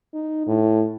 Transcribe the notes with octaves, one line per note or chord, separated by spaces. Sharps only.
D#4
A2